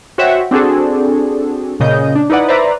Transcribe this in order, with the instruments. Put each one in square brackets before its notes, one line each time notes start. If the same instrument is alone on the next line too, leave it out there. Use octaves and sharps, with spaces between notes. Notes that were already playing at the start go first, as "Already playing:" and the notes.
[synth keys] F#4 C5 C#5 E5 F#5 G5
C4 D4 F#4 G#4 A4
A#2 C#3 D#5 G6
D4
D#4 E4 B4 D5 F#5
B4 C5 D5 E5 A#5